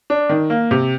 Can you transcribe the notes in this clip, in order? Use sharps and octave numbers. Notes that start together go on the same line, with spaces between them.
D4
D#3
A#3
C3